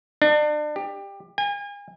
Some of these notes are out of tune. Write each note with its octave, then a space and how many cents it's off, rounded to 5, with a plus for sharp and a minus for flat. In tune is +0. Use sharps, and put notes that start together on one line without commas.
D4 +35
G4 +20
G#5 -35